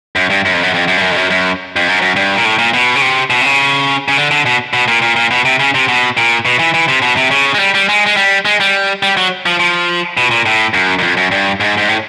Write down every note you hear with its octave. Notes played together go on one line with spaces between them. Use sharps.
F#2
G2
F#2
F2
F#2
F2
F#2
G2
F#2
F2
F#2
F#2
F2
F#2
F#2
G2
A#2
A2
A#2
B2
C#3
C3
B2
C3
C#3
C#3
D3
D3
B2
B2
A#2
A#2
A#2
B2
C3
C#3
C3
B2
A#2
B2
E3
E3
C3
B2
C3
C#3
G#3
G3
G3
G#3
G#3
G3
G#3
G3
G3
F#3
F3
F3
B2
A#2
A2
F#2
F#2
F2
F#2
G2
G#2
G#2
A2